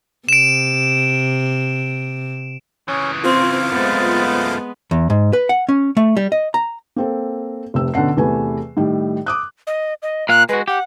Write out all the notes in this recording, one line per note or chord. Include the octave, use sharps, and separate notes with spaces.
C3 D7 E7
C#3 E3 C#4 C#5
C4 F4 C5 F5 D6
F#2 G#3 A3 B3
E2
G#2
B4
F#5
C#4
A3
G3
D#5
A#5
A#3 C4 A4
F1 C3 C4 E6
B2 D3 C#4 F#5 C7
E2 C3 E3 A3 B4 G#5
A2 D#3 G3
D6 D#6 F#6
D#5
D#5
A#2 F5 F#6
G#3 F#4 B4
G4 F#5